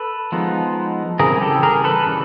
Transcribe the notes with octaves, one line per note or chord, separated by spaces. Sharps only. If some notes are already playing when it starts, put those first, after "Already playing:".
Already playing: A4 B4
F3 G#3 B3 D#4
C#3 E3 G3 C4 G#4 A#4
G4 A4
G#4 A#4
A4 B4
C#3 E3 G3